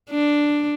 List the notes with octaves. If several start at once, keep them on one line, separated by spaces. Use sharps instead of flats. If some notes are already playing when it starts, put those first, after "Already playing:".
D4